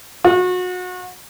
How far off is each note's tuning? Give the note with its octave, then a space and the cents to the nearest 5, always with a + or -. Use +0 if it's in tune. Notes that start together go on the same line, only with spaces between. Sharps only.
F#4 -30